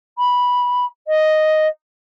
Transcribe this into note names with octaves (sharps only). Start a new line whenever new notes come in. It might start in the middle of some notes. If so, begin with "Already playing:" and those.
B5
D#5